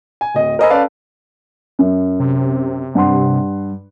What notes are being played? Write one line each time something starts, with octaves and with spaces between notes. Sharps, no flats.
G#5
D1 D#5
A#4 C5 D#5 G#5 B5 E6
C#4 A4 B4 D5 F5 A5
F#2
C3
G2 F#5 C6